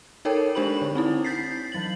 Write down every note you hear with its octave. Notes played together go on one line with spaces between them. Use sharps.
D#4 A4 A#4 C#5 G5
G#3 D4 G4 C5 B5 F#7
D3
C4 D#4 E4
G6 A6 B6 C7
E3 F#3 A6 F#7